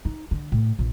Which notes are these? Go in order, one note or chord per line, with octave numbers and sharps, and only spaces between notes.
D#4
D3
A2
A#1